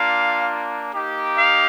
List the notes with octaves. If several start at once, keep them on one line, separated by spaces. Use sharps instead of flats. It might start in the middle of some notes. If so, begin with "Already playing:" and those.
Already playing: A#3 D4 F4 F5
A#3 D#4 G4
F5